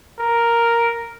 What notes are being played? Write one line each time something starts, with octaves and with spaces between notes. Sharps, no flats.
A#4